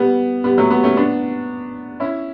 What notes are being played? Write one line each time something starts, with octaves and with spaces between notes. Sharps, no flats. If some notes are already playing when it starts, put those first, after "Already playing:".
Already playing: G3 B3
G3 B3
F#3 A3
G3 B3
A3 C#4
B3 D4
C#4 E4